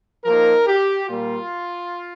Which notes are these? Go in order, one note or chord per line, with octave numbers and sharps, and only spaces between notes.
F3 A#3 D#4 A#4
G4
A#2 G3 A#3 F4